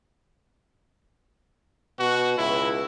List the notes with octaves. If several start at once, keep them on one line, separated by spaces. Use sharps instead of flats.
B2 F#4
C#2 E4